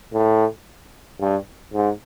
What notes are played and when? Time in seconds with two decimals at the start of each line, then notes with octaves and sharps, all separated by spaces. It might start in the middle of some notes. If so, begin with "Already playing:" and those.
0.13 A2
1.20 G2
1.73 G#2